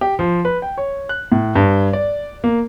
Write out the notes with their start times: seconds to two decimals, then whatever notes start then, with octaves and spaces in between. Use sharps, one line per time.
0.01 G4
0.19 F3
0.45 B4
0.62 G5
0.78 C#5
1.09 F#6
1.32 A2
1.56 G2
1.93 D5
2.44 A#3